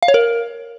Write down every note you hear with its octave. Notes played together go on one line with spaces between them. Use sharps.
F5
C#5
A#4